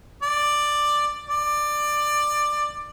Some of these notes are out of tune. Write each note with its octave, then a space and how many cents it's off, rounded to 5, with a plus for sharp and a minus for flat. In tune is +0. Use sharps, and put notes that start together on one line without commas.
D5 +5
D5 +15